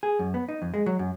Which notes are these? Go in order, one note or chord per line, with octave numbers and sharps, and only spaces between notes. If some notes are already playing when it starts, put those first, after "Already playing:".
G#4
F#2
B3
D#4
F2
G#3
F#3
F#2